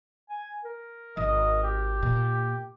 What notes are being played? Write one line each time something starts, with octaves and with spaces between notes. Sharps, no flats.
G#5
A#4
G#1 D#5
G4
A#2